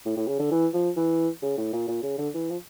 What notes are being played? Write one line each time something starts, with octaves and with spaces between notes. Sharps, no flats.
A2
A2
C#3
D3
E3
F3
E3
C#3
A2
A#2
A#2
C#3
D3
E3
F3